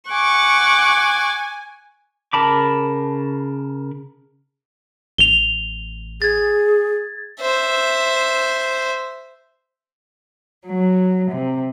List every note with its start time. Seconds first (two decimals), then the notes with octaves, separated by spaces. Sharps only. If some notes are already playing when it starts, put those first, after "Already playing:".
0.11 F#5 G#5 C#6 D6
2.33 C#3 A#4 A5 B5 D6
5.18 A1 F7 G7
6.22 G#4 G#6 A6
7.41 C5 E5
10.66 F#3
11.31 C3